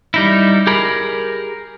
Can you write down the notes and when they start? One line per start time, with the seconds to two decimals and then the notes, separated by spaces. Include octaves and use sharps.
0.14 G3 D#4 E4
0.67 G4 G#4 A#4 B5